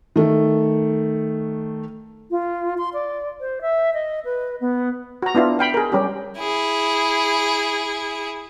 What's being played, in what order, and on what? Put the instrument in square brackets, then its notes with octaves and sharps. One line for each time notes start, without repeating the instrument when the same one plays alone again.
[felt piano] D#3 A3
[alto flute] F4
C6
D5
C5
E5
D#5
B4
B3
[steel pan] F#4 A#5
B3 D4 E4 F4
F5 G5 B5
G#4 A#4
G3 C#4 G4
[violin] E4 G#4